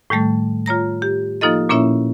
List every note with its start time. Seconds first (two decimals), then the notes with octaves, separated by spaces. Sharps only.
0.10 A2 D#3 G3 A3 A4
0.66 F4 C#5 A#5 A#6
1.02 G4
1.41 F3 A#3 D#4 F4 A4 D#5
1.69 A#2 A#3 C#4 E4 C#5 E5